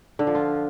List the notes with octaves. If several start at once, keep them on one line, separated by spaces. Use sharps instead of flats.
D3
F3
F4